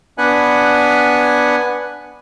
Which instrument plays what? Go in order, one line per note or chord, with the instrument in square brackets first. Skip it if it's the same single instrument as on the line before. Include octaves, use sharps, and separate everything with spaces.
[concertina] B3 D4 B4 F#5 G#5 F#6